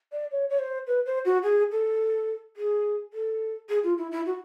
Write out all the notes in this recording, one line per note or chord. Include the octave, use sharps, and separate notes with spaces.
D5
C#5
C#5
C5
B4
C5
F#4
G#4
A4
G#4
A4
G#4
F4
E4
E4
F#4